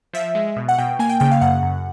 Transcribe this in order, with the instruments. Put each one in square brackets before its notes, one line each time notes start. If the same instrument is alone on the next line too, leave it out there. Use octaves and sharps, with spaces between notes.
[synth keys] F3 E5
G#3
B2
F#5
B2 G5
A#3 G#5
G5
C#3 G5
F5
F#2 F#5
F#2